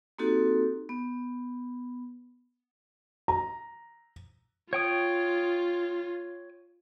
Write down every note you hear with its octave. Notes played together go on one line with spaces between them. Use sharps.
A#3 C4 D#4 F#4 G4 A4
B3
A#5
F4 C#5 G5 D#6